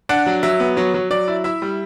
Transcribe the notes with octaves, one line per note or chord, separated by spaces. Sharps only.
D4 F#5
F#3
F#3 E5
B3
F#3 C#5
F#3
F#3 D5
E4
E4 E5
G3